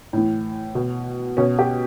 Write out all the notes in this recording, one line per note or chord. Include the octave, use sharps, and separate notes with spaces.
A2 E3
B2
B2 C#4
G4